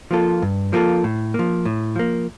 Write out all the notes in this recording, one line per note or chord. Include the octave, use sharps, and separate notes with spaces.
F3 A#3 F4 A4
G2
F3 A#3 F4 A4
A2
F3 A#3
A2
F3 A#3